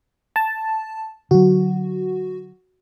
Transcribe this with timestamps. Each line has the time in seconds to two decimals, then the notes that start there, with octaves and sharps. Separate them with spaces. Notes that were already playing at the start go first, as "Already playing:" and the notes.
0.36 A5
1.31 D3 F#3 F#4